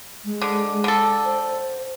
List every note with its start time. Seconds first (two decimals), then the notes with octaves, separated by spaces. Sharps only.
0.25 G#3
0.42 D3
0.84 D3 A4
1.25 C5